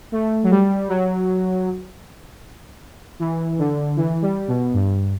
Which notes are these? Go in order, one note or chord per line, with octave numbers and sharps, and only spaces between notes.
A3
F#3
G3
F#3
E3
D3
E3
G3
B2
G2